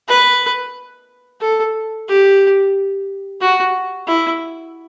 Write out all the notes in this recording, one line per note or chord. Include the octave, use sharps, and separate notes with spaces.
B4
A4
G4
F#4
E4